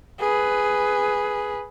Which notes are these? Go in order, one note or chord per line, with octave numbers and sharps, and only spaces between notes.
G#4 B4